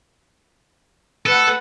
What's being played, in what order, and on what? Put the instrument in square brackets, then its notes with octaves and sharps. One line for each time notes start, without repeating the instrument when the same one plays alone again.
[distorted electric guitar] A4 [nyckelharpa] B4 F#5